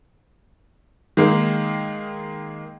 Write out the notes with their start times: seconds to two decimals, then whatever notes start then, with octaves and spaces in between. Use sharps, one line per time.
1.17 D#3 G#3 A#3